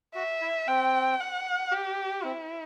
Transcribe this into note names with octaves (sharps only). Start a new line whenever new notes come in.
F#4 E5
E4
C4 G5
F#5
G4
C4 E4